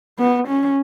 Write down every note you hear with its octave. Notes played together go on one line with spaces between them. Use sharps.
B3
C#4